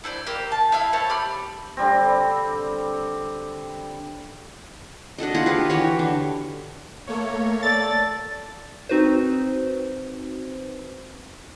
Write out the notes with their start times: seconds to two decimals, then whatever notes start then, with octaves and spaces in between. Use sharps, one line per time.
0.04 E4 A4 C5 D5
0.27 A#3 G4
0.52 A5
0.72 E4 E5 F5
0.93 E4 C5 C#5 A5
1.10 G4 B5 F6
1.77 D3 G3 C4
5.18 D4 F#4 A4 D#5
5.34 E4 F4 G#4 F#5
5.46 G4 B4 D#5
5.70 E3 F#4 G4 C#5
5.99 D3
7.07 A3 A#3 C#5
7.63 A4 D5 A6
8.89 C4 D#4 F#4 B4 C5